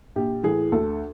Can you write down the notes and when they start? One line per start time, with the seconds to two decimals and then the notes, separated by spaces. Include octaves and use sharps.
0.16 A#1 G4
0.43 A2 E3 G#4
0.72 D2 A4